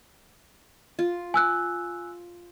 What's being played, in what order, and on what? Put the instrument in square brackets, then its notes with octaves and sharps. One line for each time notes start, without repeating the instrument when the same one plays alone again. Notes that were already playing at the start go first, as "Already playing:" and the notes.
[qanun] F4
[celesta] G#5 E6 F#6